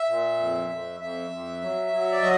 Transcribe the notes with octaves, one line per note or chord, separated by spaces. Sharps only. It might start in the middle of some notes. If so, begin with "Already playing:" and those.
Already playing: E5
A#2
F2
F2
F2 E5
F2
F#3
F#3
D5
F#3 D#5